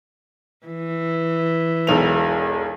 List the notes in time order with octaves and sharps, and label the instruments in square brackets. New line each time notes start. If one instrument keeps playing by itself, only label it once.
[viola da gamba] E3
[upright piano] E1 B1 F7